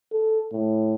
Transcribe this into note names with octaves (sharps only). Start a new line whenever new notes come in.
A4
A2